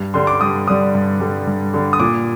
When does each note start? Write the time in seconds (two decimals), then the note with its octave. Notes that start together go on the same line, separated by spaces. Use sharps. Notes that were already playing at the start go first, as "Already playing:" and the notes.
Already playing: G2
0.14 D3 G3 C6
0.27 D6
0.41 G2 D#6
0.67 D3 G3 D#6
0.95 G2
1.20 D3 G3
1.47 G2
1.74 D3 G3
1.93 D#6
2.00 A#2 D6